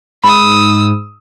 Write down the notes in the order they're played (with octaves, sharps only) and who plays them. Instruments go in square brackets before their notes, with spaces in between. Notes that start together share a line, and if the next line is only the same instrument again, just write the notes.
[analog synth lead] G#2 [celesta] B5 [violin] D#6 E6